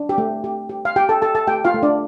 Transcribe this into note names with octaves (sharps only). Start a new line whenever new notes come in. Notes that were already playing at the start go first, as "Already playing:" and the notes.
Already playing: D4
G4
A3
G4
G4
F5
G4 G5
A4 A5
G4 A4 A5
A4 A5
A3 G4 G5
F4 F5
A3
D4 D5